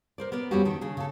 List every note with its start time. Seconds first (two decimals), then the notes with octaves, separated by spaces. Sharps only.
0.18 A#4 C5 D5
0.32 B3 A#4 D5
0.51 F2 G3 B3 C#4 F#4 G4
0.65 D#3 A4
0.81 C#3 D4 G#4
0.97 C#3 A4